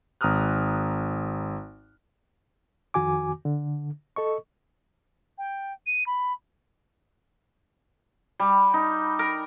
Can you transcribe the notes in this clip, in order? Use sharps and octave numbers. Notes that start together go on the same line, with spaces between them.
G#1 A#5 D#6 F6 F#6
F2 D#3 F#4 G#5 D6
D3
A4 D#5 C#6
G5
D#7
B5
G3
D#4
A#4